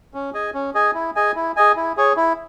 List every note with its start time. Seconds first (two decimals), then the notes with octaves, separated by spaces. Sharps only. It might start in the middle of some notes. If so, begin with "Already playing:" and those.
0.14 C#4
0.34 G#4 D#5 G#5
0.54 C#4
0.75 G#4 D#5 G#5
0.94 E4
1.16 G#4 D#5 G#5
1.35 E4
1.56 G#4 D#5 G#5
1.76 E4
1.97 G#4 C#5
2.17 E4